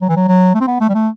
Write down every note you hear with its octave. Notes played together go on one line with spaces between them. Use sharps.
F#3
E3
F#3
F#3
A3
C4
B3
A3
G3
A3